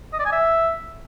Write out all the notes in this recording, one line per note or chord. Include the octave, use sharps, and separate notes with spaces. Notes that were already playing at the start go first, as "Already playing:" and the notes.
D#5
D5
G#5
E5